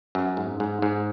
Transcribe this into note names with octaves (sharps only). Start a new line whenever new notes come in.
F#2
G#2
G#2
G#2